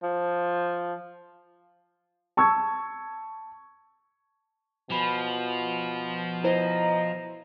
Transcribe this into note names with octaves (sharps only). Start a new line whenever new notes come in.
F3
A5 C#6 E6 G#6
B2 F3 G#5 B5
E4 B4 C5 D#5 A#5